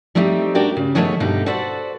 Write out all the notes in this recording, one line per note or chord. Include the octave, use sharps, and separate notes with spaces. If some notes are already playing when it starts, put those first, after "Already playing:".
G3 A3 C4 D#4 G4
D4 F#4 G4 A#4 D5 G5
C#3
D#3 F3 A3 B3 G#4 C#5
G2 B2 D3 D#4 G4
F#4 A4 B4 C5 D5 F#5